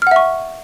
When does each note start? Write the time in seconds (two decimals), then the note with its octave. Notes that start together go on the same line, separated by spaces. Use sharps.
0.02 F6
0.07 F#5
0.11 E5
0.16 C#6